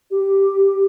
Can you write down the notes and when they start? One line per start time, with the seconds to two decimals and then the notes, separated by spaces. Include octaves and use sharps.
0.10 G4